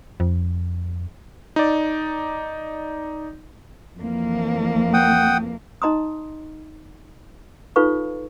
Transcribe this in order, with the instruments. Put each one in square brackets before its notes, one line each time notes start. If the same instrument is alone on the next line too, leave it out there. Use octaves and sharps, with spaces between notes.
[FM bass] F2
[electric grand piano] D#4 D5
[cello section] F2 E3 A#3
[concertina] F#5 G5 D#6
[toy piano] D#4 D#5 A#5 C6 D#6
D#4 F4 A4 B4 F5 C#6